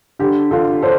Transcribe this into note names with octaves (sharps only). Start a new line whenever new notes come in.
D3 G4
D3 F4 A4
D4 A4 C5